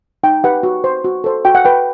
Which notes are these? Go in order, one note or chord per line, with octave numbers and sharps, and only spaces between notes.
D#4 G5
G4 B4 F#5
F#4
C5
F#4
A4 C5
F#4 G5
F#5
B4 G5